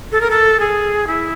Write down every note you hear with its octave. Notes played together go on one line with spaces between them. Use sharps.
A4
A#4
A4
G#4
E4